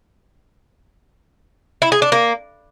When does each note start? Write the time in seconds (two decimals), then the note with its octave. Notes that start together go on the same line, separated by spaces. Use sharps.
1.82 E4
1.92 G#4
2.02 D4
2.12 A#3